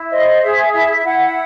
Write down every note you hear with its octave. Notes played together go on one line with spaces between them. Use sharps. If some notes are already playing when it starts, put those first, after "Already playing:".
Already playing: E4
C5 D#5
G#4 E5
E4 E5
E4 F#5